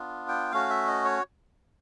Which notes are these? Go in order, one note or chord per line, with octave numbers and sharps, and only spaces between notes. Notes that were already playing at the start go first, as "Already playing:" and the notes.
Already playing: B3 D4 F4
G5
A3 C#4 F#4 F5
E5
D#5
C#5